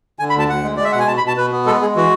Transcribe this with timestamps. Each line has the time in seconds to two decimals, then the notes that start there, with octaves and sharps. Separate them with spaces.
0.19 D3 G#5
0.30 B5
0.35 D2 A5
0.49 D2 F#5
0.64 G#3
0.77 G#3 D5
0.84 E5
0.92 B2 F#5
1.00 G#5
1.07 B2 A5
1.17 B5
1.23 B2 A5
1.37 B2 B4
1.52 B3
1.66 G#3 A4
1.81 G#3 G#4
1.96 E3 F#4